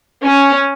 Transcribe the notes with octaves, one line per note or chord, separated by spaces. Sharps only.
C#4